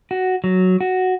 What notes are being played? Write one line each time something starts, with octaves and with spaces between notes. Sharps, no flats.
F#4
F#3
F#4